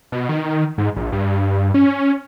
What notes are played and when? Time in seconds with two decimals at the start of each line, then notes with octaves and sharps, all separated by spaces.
0.12 B2
0.29 D#3
0.78 G#2
0.96 A#1
1.12 G2
1.74 C#4